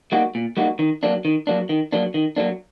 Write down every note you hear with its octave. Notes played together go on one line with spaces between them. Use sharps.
G3 A#3 D#4 F#4
A#2
G3 A#3 D#4 F#4
D#3
F#3 A#3 D4
D#3
F#3 A#3 D4
D#3
F#3 A#3 D4
D#3
F#3 A#3 D4